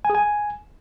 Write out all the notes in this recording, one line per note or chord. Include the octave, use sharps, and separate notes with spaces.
G#5
G#4
G#5